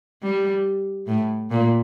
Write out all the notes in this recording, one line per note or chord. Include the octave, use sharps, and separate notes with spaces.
G3
A2
A#2